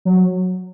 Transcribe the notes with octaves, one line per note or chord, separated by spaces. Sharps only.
F#3